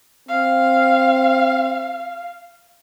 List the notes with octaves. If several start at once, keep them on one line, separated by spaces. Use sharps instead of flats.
C4 F5